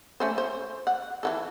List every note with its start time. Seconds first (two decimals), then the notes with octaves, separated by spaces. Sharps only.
0.20 A3 C#4 C5
0.38 C5
0.87 F#5
1.23 E3 F#3 A4